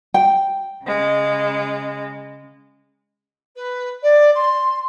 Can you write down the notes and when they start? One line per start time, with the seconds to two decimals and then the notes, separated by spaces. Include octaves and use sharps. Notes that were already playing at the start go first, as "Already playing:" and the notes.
0.14 G5
0.85 C#3 G#3
3.56 B4
4.03 D5
4.35 C6